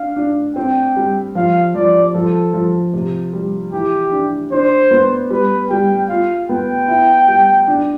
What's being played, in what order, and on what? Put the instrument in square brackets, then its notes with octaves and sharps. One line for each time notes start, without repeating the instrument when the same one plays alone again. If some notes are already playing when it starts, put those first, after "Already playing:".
Already playing: [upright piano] D4 [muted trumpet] F5
[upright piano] D4
[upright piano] C4 [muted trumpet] G5
[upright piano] G3
[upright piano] F3 [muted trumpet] F5
[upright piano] F3 [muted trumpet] D5
[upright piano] F3 [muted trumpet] A4
[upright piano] F3
C3
G3
[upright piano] E3 [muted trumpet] G4
[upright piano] D4
[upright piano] D4 [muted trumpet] C5
[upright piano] B3
[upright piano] G3 [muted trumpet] B4
[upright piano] G3 [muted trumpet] G5
[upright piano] F4 [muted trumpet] F5
[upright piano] B3 [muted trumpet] G5
[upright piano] E4
G3
D4